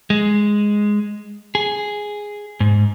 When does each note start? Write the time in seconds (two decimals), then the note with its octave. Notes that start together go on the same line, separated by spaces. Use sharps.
0.10 G#3
1.55 G#4
2.60 G#2